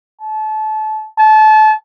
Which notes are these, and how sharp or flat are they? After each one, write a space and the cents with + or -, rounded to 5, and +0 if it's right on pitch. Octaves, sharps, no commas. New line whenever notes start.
A5 -30
A5 -30